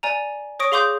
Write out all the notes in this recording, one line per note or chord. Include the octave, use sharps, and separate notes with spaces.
D5 G#5 A#5
C#5 C#6 D#6 A#6 D7
G#4 F5 C6 D6 D#6 G6